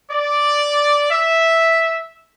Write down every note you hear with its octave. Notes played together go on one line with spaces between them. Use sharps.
D5
E5